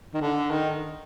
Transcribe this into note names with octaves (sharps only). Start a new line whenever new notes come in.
D#3
D3
D#3